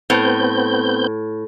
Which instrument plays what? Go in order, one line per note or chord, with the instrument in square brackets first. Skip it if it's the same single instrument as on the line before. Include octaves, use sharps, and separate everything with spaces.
[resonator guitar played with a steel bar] A2 [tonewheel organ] B3 C4 G6